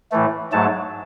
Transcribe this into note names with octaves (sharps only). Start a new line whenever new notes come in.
A2 E3 A3
G#2 F#3 A3 A5